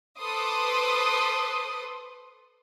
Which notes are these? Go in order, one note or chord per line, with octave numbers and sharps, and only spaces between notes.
A4 B4 C5 C6 D6 D#6